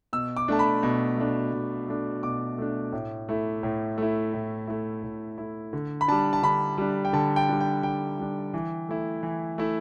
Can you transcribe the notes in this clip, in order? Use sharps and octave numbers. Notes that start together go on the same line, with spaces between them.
B2 E6
D6
A3 D4 A5
B5
B2
A3 D4
B2
A3 D4
B2 D6
A3 D4
A2
A3 E4
A2
A3 E4
A2
A3 E4
A2
A3 E4
D3
B5
G3 D4 A5
A5
D3 B5
G3 D4
G5
D3 A5
G5
G3 D4
G5
D3 G5
G3 D4
E3
A3 E4
E3
A3 E4